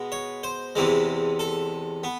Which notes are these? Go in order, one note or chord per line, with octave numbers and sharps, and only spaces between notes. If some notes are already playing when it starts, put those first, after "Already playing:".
Already playing: B2 G#3 B3
C#5
C5
E2 C3 E3 G#3
A4
B3